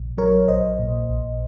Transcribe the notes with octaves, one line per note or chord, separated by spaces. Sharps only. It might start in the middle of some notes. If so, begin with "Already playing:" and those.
Already playing: A#1
F#3 A#4 C#5
A#1 C5 D#5
A#2
A#1